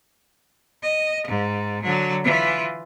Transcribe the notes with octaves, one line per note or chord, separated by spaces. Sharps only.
D#5
G#2
D3 F#3
E3 F4